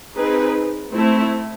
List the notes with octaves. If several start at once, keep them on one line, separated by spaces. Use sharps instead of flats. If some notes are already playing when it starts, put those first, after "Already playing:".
C4 D#4 G#4 B4
A3 C4 E4